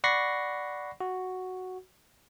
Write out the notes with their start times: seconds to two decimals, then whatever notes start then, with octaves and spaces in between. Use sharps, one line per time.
0.04 D5 F#5 B5 C#6 A#6 C7
1.01 F#4